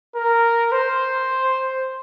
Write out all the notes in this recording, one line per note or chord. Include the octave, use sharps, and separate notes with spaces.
A#4
C5